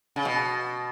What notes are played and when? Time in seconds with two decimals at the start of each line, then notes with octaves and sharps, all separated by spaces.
0.16 C#3
0.25 B2